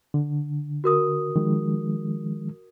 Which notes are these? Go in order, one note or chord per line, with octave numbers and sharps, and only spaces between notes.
D3
F#4 A#4 D#6
D#3 F3 G#3